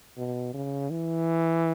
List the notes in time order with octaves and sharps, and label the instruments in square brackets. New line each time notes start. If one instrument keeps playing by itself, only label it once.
[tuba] B2
C#3
E3